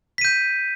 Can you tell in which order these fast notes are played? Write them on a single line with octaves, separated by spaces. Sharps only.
B6 D#7 G6